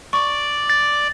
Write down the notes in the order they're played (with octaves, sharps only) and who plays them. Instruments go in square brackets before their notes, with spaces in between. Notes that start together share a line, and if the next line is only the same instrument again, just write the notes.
[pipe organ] D5 [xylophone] C#6
[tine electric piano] A6